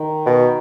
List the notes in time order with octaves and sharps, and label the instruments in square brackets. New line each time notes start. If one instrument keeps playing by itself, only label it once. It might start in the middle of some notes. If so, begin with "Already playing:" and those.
Already playing: [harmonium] D#3
[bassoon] B2